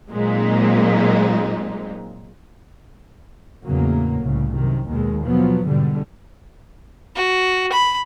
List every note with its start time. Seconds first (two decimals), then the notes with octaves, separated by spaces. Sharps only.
0.11 A#2 F#3 G#3 A#3 C4 D#4
3.64 E2 A2 C#3 F#3 A#3
4.23 C2 A2 C#3
4.55 F#2 C3 D#3
4.89 D#2 B2 D#3 G#3
5.23 B2 F3 F#3 B3
5.67 G#2 B2 D3 G3
7.16 F#4
7.72 B5